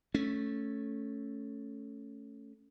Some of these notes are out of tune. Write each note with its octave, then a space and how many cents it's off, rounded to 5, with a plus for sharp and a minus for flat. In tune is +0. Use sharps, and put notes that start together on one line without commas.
A3 +0 C#4 +0